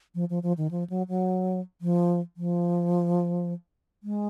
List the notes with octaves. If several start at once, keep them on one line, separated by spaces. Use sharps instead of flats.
F3
F3
F3
D#3
F3
F#3
F#3
F3
F3
G#3